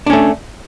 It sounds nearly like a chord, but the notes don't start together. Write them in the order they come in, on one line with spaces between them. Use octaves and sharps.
D4 C#4 A3